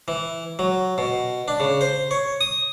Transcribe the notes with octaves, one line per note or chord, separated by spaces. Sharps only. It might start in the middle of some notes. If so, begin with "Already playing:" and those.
E3
F#3
B2
D4
C#3
C5
C#5
D#6